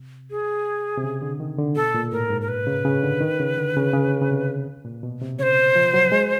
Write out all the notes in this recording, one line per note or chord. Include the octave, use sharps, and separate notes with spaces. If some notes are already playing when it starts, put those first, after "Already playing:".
Already playing: C3
G#4
C3
C#3
D3
D#3
D3
B2 A4
A#2
A2 A#4
G#2
A#4
B4
C#3
C#3
D3
D#3
C#3
D3
C#3
C#3
C#3
C3
A#2
B2
C3
C#3 C5 C#5
F3
F#3
G#3